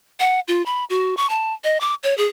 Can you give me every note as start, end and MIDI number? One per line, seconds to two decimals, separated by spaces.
0.20 0.40 78
0.48 0.64 65
0.66 0.85 83
0.90 1.15 66
1.17 1.29 85
1.30 1.53 81
1.64 1.80 75
1.80 1.94 86
2.03 2.16 73
2.18 2.26 68